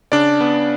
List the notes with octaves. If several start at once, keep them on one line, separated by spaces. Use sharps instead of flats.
C#3 D4 D5
B3